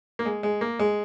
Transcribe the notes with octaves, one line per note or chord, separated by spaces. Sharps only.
A#3
G#3
G#3
A#3
G#3